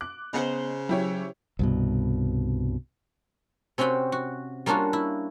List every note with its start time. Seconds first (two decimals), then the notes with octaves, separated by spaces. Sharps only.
0.01 D6 F#6
0.33 C#3 B3 C5 D#5 F#5 A#5
0.89 F#3 E4 G4 C#5
1.59 C2 G2 B2
3.78 C3 C4 C#4 F#4 G5 B5
4.12 F#4
4.66 G3 A#3 C#4 D4 F4 F#4
4.93 E4